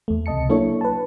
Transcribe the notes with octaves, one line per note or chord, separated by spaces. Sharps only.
E2 A3
C#2 C3 D#5 A5 C#7
F#3 A#3 D4 E4 A4 C#5
B4 A5